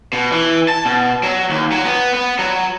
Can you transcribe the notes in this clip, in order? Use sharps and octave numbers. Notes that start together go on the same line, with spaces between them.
B2
E3
A5
B2
F#3
D#2
F#3
B3
B3
F#3